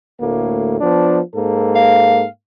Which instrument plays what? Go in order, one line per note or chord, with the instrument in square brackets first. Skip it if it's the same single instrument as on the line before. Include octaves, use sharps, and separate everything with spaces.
[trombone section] D2 A2 A#3
F3 B3 D4
G#2 A#3 A4
[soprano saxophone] F5